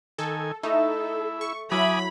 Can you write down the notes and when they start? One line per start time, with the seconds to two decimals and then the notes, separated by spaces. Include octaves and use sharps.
0.19 D#3 A4 G#5
0.63 A3 D#4 E4 A4
1.41 C#6
1.72 F#3 E4 G#5 B5 D6 D#6